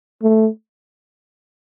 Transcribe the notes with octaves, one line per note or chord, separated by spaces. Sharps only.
A3